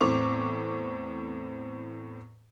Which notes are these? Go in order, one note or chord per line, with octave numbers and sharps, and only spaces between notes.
E2 A2 C4 C#6 D6 F7